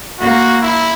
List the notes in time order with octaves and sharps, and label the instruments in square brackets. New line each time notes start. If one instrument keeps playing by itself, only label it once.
[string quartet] A#3 [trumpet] F#4
[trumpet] E4